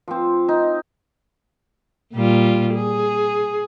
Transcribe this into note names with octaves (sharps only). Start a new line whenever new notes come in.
F3 C4
D#4
A#2 G3 F4
G#4